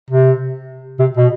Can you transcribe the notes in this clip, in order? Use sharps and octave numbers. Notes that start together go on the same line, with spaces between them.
C3
C3
B2